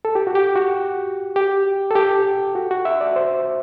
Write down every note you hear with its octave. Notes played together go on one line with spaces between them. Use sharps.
A4
G4
F#4
G4
F#4
G4
A4
G4
F#4
F#4
E5
D5
C5